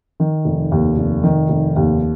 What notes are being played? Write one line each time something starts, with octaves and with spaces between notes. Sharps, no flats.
D#3
F1
D#2
F1
D#3
F1
D#2